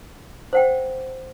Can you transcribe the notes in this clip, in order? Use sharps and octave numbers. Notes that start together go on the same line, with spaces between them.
C5 F#5 G5